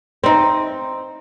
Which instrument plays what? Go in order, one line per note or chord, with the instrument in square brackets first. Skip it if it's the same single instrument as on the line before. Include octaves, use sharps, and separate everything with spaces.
[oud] C4 D#4